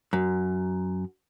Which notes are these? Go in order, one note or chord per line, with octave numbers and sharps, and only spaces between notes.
F#2